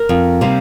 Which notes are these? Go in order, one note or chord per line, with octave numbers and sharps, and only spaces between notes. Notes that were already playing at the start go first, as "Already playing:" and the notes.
Already playing: A#4
F2
C3 G3 A#3 D#4